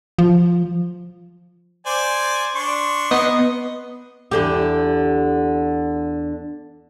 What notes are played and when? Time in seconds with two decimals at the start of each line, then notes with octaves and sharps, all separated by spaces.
0.19 F3
1.86 C5 D5 G#5
2.55 D4 C6 C#6
3.11 B3 D#5
4.31 E2 D3 G4